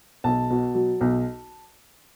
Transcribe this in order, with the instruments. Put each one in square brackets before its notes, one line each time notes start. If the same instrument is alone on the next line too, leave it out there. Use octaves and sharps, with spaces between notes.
[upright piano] B1 A5
B2
F#3
B1